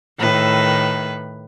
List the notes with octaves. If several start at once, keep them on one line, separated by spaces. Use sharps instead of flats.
A2 D#3 B4